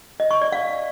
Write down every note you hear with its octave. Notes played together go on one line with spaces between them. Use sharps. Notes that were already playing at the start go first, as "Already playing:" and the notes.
D#5
C#6
D5
F5